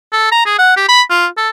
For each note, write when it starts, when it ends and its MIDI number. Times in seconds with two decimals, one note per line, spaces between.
0.12 0.30 69
0.32 0.45 82
0.46 0.57 68
0.59 0.73 78
0.76 0.87 67
0.88 1.02 83
1.10 1.27 65
1.37 1.50 69